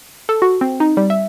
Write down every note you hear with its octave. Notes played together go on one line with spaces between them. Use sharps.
A4
F#4
C4
D#4
G3
E5